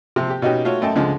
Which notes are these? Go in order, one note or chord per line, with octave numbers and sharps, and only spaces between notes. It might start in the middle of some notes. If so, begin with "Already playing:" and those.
C3 F3 C4
G4
B2 C#4 D#4 F#4 G4
A3 F4 F#4 C#5
F#2 A3 D#5 G5 A5
C#2 D3 F3 G#3